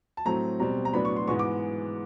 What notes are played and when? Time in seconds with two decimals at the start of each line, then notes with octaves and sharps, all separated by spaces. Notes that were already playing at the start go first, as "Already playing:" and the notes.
0.17 A5
0.26 A2 F#3 A3 C4 A#5
0.60 B2 G3 C4 A#5
0.85 A#5
0.93 A2 F#3 B3 D4 B5
1.05 C#6
1.16 C6
1.27 G#2 E3 G#3 B3 C#6
1.39 D6